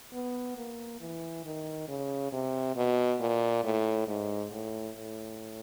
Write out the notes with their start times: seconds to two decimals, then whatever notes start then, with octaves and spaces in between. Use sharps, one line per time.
0.12 B3
0.57 A#3
1.01 E3
1.44 D#3
1.88 C#3
2.32 C3
2.76 B2
3.20 A#2
3.64 A2
4.08 G#2
4.52 A2
4.96 A2